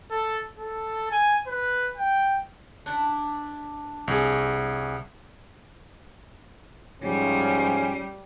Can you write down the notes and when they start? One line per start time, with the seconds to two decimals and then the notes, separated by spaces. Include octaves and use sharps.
0.11 A4
0.59 A4
1.11 G#5
1.47 B4
1.98 G5
2.86 D4 E4
4.08 C2 G#4
7.03 G#2 F3 G3 C#4